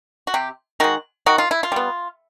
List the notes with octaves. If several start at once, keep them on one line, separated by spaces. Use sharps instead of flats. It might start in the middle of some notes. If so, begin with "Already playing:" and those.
F#4
C3 G4
D#3 G#3 F#4
D#3 F#4
F4
E4
F4
G3 B3